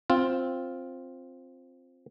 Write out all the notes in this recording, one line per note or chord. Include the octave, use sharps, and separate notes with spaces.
C4 F4